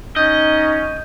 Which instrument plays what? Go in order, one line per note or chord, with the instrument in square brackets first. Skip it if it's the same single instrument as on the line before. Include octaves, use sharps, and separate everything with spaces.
[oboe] C#4 [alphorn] D#4 [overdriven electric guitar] D#5 [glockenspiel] G6